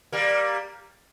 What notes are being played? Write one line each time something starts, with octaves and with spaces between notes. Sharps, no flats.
G3 A#3